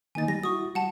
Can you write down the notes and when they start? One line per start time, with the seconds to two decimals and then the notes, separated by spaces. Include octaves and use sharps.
0.15 D#3 A#3 D#4 G#5 A6
0.28 G3 A#6
0.43 E4 F#4 C#6 D#6
0.75 G3 F#5 A5